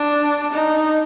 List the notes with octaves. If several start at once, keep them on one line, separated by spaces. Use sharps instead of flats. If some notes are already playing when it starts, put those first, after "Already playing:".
Already playing: D4
D#4